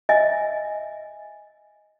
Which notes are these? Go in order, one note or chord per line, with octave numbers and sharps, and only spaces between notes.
D#5 E5 G#5